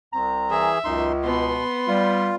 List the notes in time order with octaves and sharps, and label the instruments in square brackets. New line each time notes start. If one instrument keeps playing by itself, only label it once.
[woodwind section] C2 C4 A#5
[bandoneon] E3 G#4 [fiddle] E5
[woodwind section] C#2 [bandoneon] F#2 D#4 C6
[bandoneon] B2 [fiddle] B3 C6
[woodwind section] G3 [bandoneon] F4